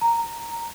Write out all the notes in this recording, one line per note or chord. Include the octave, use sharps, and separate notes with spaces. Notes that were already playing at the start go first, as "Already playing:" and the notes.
A#5